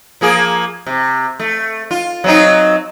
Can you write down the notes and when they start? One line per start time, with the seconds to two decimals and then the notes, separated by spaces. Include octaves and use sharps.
0.21 F3 A#3 G#4
0.87 C3
1.40 A3
1.91 F4
2.24 F#3 C4 D#4